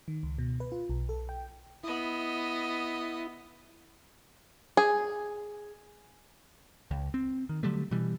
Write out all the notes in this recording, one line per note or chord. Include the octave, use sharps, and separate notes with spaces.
D#3
C#2
B2
B4
F4
B1
A4
G5
B3 E4 D#5
G#4
C#2
C4
D#3
D3 F#3 G3 A3
B2 E3 G3